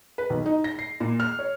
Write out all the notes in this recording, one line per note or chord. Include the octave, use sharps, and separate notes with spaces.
B4
B1
D#4
A#6
C7
A#2
F6
C#5